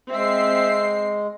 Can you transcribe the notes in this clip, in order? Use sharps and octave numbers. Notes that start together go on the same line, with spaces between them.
G#3 C4 E5 C7